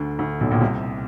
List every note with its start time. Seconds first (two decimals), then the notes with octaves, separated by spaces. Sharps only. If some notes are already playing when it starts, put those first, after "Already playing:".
Already playing: D2 D3
0.19 D2 D3
0.41 B1 B2
0.51 A#1 A#2
0.61 C2 C3